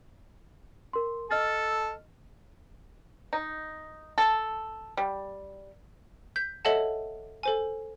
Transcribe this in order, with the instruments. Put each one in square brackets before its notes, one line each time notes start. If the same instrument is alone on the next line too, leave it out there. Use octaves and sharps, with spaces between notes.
[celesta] A#4 C6
[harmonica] A4 [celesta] D#5 F6 A6
[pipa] D#4
A4
G3
[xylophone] G6 B6
A4 C#5 D#5 E5 F#5 A5
A4 C5 G#5